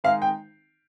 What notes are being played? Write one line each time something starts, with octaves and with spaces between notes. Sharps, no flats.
D#3 G#3 D#4 F5
G5